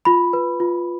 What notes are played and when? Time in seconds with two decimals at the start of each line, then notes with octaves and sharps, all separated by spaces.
0.05 F4 B5
0.33 B4
0.60 F4